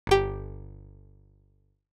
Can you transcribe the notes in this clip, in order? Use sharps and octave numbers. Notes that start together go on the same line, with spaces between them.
G1 G4